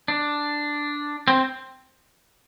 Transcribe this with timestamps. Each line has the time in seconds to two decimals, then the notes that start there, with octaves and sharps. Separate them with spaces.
0.08 D4
1.28 C4